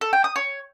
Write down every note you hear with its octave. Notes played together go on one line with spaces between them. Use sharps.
A4
G5
D#6
C#5